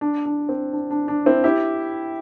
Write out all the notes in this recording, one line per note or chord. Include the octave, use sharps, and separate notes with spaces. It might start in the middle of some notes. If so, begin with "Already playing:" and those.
D4
D4
C4
D4
D4
D4
C4 E4
E4 G4